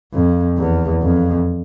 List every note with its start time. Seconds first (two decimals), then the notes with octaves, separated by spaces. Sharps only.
0.14 F2
0.58 E2
1.03 F2